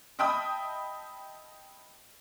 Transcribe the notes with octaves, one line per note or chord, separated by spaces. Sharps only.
D#5 E5 G5 A5 B5 D#6